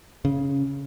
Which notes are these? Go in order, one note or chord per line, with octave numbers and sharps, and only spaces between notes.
C#3